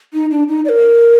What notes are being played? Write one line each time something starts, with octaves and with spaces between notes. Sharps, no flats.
D#4
D4
D#4
D5
A#4